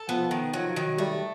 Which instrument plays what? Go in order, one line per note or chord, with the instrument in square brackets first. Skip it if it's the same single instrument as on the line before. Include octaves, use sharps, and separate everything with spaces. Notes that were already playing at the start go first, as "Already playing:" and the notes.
Already playing: [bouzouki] A4
[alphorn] F3 [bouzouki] B3
[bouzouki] D#3
[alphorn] F3 [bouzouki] F#3
[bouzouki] D#3
[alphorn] G3 [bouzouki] A3